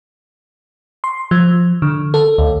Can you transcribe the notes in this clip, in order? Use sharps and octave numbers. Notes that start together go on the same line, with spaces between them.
C6
F3
D3
A4
D2